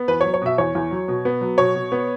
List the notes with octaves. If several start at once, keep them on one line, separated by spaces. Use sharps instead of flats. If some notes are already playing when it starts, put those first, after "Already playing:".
Already playing: B3
E2 B4
C#5
F#3
C#5
B2 E5
E2 C#5
E2
F#3
B2
B3
F#3
B2 C#5
B2
B3